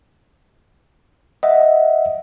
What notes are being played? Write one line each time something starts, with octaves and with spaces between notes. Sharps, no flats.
D#5 E5 F#5